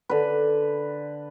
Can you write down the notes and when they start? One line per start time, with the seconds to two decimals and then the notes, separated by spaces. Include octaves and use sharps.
0.09 D3 B4